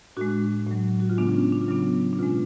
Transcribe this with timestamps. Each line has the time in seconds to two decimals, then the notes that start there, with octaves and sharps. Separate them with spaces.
0.17 A2 G#3 D4 F#4
0.67 A2 F#3
1.00 F#4
1.09 F4
1.18 C#3 G#3 B3 D4
1.29 D4
1.35 C#4
1.52 D4
1.61 F4
1.68 C#3 F#3 B3 D4
2.13 D4
2.19 B2 G#3 C#4 F4